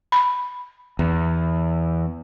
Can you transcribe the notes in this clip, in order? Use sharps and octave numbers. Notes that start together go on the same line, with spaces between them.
B5
E2